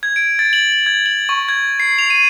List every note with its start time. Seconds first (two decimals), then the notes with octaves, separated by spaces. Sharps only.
0.03 G#6
0.16 D7
0.39 A6
0.53 F#7
0.72 F#7
0.86 G#6
1.06 F#7
1.29 C#6
1.48 G#6
1.80 C7
1.98 F7
2.10 D#7